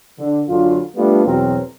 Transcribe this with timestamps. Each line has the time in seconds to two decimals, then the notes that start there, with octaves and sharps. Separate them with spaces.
0.18 D3
0.48 F#2 D3 F4
0.96 G3 A3 B3 D4 F4
1.25 E2 B2 F#3 C4 A#4